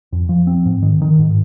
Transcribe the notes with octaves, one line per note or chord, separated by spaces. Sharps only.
F2
F3
C4
G#2
D#3
D#3
G#2